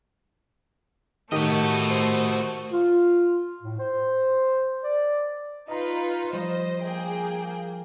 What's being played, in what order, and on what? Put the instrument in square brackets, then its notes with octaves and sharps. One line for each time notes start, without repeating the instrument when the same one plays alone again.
[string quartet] A2 A3 [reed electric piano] D#3 G4 A#4 [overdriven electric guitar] F#4 D#5
[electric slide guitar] C5
[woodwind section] F4
A2
C5
D5
[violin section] D#4 F4 B4 [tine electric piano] D#5 A#5
[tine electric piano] F3 G3 [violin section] C5 D#5
[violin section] A#3 G#4 G5